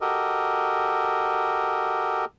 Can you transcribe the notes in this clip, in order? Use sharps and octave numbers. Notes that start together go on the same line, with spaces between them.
F#4 G4 A4 A#4 D#5